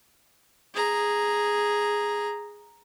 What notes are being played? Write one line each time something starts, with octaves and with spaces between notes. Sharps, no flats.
G#4 A#5